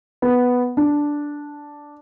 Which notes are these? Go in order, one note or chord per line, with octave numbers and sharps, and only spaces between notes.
B3
D4